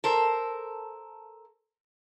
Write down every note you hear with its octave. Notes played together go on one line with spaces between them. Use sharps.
A4 A#4 C5